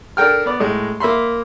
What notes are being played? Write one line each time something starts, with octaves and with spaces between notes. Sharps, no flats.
D4 A4 A#4 G5 F6
B3 D5
A2 G#3
A#3 E5 B5 C6